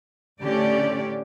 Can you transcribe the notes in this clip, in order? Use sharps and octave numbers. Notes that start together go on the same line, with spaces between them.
A2 D3 A3 C#4 G4 D5